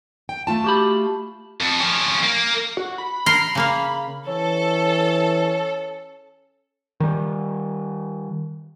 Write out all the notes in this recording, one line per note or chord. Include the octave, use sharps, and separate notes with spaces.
G5
A3 F4 A5
F#4 G4 B5
F2
F3 C#4
A#3
F#4
B5
A#4 C6
C#3 A#3 F5
E3 C#4 A4
D#3 G3